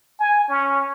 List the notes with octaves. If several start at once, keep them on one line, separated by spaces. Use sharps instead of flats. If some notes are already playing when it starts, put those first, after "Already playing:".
G#5
C#4